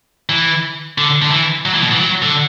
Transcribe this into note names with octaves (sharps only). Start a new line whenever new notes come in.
E3
D3
D3
E3
F#3
E3
B2
E3
F#3
D3